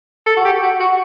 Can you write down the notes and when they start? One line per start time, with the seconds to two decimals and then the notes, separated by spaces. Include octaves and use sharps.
0.27 A4
0.36 F#4
0.45 G4
0.63 F#4
0.80 F#4